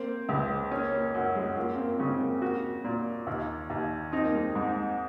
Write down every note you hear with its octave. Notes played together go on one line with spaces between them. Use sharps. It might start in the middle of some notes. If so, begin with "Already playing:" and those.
Already playing: A#3 C4
C#2 G#3
A#3 C#4
A#3
F#2 A#3
G#3
A#3 F4
C4
A#3
C#3 G#3 C4
C4
A#3
A#3 F#4
A#2
D#2
D#2
C4 D#4
A#3
G#3 C4
G#2